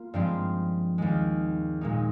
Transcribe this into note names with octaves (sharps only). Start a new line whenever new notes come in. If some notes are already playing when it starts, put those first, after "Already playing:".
Already playing: A#3 F4
G2 F3 G#3 C4
D#2 D#3 G#3
A#2 G#3 D#4